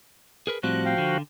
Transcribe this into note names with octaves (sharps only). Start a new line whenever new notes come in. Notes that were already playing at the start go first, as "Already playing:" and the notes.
G#4 A#4 B4
A2 F3 G3 C4 F#4 F#6
F5 G5
D3